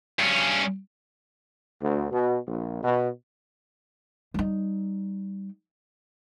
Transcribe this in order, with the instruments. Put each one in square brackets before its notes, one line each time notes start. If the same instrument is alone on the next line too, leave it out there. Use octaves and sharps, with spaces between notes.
[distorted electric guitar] G2 C#4
[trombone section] D2
B2
A#1
B2
[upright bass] G3 D#4